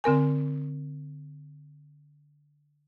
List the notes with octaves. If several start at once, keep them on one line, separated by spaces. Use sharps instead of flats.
D3 C4 A#4 G#5